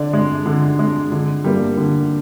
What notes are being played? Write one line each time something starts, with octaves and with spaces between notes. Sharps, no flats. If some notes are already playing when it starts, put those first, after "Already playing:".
Already playing: D3 D5
G#3
D3
G#3
D3
G3 A#3
D3